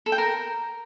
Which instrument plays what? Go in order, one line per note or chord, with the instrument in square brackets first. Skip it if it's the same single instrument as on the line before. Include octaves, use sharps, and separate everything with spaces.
[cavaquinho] A4
G5
A#4